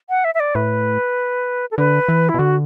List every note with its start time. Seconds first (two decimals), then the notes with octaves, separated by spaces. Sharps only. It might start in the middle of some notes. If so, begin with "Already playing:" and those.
0.09 F#5
0.24 E5
0.34 E5
0.40 D5
0.55 A2 B4
1.71 A4
1.78 D3 B4
2.08 E3
2.29 E4
2.34 B2
2.39 D3 F#4